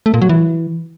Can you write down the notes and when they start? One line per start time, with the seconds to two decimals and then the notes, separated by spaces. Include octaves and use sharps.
0.06 A3
0.14 A#2
0.22 F#3
0.29 E3